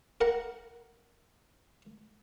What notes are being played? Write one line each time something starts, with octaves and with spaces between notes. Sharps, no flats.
A#4 F#5 A#5